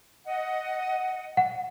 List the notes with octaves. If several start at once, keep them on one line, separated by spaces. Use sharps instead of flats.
D#5 F#5
F#5